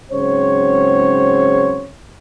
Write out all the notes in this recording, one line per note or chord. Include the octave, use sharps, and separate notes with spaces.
G#2 C#3 F#3 C4 C5 C#5